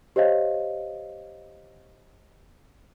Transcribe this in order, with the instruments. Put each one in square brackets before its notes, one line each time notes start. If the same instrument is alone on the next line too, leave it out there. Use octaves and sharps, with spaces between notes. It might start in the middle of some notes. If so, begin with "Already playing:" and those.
[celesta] G4 C5 C#5 D#5 F5